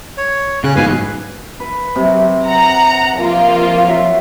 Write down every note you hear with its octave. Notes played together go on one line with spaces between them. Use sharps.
C#5
C#3 C#4 F#6
B1 G#2 B2 B4 F5 G#5
B4
C3 F#3
F#5 A#5
F3 A#3 F4
F#3 E5